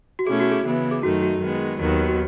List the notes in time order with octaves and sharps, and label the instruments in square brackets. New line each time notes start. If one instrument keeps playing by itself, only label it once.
[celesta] F#4
[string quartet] B2 A3 C#4 E4 [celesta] G#4
[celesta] F#4
G#4
[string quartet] C#3 E3 B3 E4
[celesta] G#4
[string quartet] F#2 D#3 A3 D#4 [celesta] F#4
[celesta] F#4
[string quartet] D#3 G#3 B3
D#2 D#3 F#3 B3
[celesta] F#4